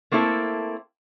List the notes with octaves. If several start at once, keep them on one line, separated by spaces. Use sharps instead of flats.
A3 A#3 C4 E4 A4